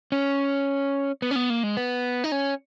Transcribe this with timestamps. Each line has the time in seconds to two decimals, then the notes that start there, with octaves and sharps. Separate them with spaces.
0.12 C#4
1.22 B3
1.31 C#4
1.36 B3
1.50 A#3
1.63 G#3
1.77 B3
2.24 D#4
2.32 C#4